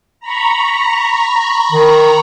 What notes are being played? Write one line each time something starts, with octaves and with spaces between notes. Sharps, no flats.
A#5 B5 C#6
D#3